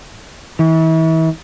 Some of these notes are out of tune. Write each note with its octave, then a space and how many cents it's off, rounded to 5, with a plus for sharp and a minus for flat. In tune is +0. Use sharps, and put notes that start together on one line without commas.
E3 -35